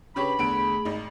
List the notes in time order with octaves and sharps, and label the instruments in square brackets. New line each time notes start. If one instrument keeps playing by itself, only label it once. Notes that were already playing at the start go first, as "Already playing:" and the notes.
[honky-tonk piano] C#3 G4 C#5 [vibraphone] D4 B4 [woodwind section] B5
[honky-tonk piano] E2 D3 D7 [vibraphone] A3 G#4
[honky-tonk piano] G#1 D#4